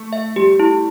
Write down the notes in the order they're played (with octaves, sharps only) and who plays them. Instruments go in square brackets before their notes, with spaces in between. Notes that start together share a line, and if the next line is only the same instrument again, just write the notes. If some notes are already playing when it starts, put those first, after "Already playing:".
Already playing: [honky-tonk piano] A3
[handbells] E5
[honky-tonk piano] G3 [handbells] G4
[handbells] E4